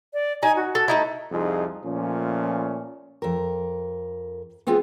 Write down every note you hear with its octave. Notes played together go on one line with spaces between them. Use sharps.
D5
D#4 G#5
F#4
A4
A3 D#4 E4
C2 F2 D#4 F4 G#4
A#2 F3 A3 C#4
F2 A#4
B3 C4 F4 G#4 B4